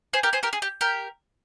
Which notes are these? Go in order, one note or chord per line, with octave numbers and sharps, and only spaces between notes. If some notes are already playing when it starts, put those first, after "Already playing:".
G#4 C5
G4 A#4
G#4 C5
G4 A#4
G#4
G4
G4 A#4